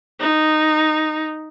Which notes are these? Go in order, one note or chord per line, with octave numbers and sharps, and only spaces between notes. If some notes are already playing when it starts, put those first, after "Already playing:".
D#4